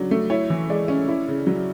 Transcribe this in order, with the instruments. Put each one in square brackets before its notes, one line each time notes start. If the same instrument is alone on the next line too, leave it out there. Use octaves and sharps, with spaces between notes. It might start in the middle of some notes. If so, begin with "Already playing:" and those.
Already playing: [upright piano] C#3 F#3 D4
A3
E4 C#5
E3
G#3 D5
C#4
E4
C#3
F#3